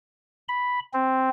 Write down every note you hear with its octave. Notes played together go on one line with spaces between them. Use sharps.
B5
C4